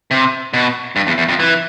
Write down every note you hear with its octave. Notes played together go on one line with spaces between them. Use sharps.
C3
B2
G2
E2
E2
F2
E3